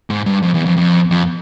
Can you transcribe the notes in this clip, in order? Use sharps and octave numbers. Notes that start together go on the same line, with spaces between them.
G#2
G2
F2
E2
F2
F2
F2